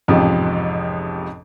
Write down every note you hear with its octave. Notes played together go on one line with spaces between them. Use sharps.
A1 F2 G#2 C3 F3